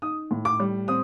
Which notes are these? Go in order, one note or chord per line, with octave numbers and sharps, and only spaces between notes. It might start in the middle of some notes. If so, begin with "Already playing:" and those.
D#4 D#6
A2
D6
G3
C4 D#6